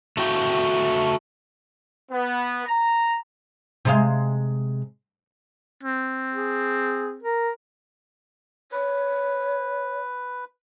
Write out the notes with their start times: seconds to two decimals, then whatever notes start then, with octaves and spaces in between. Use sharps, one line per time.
0.17 A3 F#4 G5
2.11 B3
2.66 A#5
3.85 C3 G#3 F5
5.83 C4
6.32 G#4
7.22 A#4
8.72 B4 C#5